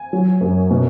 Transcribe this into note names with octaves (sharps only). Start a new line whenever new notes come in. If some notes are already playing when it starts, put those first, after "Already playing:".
Already playing: G#5
F#3
F#2
B2